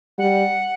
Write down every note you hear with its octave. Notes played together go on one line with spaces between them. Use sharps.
G3 F#5